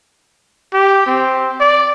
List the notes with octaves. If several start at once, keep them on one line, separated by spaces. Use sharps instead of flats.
G4
C4
D5